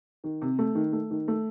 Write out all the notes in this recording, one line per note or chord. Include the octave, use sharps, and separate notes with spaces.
D#3
C3
A3
D#3
A3
D#3
A3